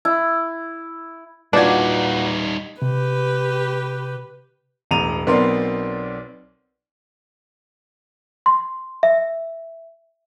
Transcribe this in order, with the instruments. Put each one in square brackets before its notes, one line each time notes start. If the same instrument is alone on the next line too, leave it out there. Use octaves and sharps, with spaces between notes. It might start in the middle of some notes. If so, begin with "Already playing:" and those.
[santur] E4
[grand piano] A#2 D#5 G#6 [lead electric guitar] G3 D#4 [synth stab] D4 [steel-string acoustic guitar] F#4 B4
[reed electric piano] C3 [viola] G4 B4
[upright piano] E1 A1 A#5 D#7 F7
B1 B3 C4 A#4 D5 C6
[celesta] C6
E5